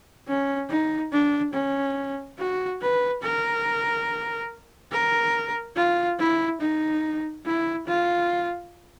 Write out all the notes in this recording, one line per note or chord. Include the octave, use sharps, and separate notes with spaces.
C#4
D#4
D4
C#4
F#4
B4
A#4
A#4
F4
E4
D#4
E4
F4